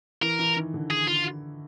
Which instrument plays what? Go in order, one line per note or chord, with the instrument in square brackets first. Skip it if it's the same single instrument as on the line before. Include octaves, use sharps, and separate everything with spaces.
[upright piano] E3 [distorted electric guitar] A#4
[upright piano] E3
D#3
D3
[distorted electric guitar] G#4
F4